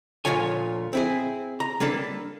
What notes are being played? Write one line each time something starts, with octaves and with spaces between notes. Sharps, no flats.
D2 A#2 F3 F4 C#5 G#5
C4 E4 G#4
A#5
G3 A#3 D4 A4 B4